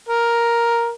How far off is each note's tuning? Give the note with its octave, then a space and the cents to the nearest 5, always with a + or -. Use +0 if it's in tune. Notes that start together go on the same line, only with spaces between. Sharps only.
A#4 +5